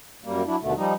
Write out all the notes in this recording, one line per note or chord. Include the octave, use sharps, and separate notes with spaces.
F#2 G3 A#3
F#3 D4 E4
D#2 B2 D3 A3
F3 G3 D#4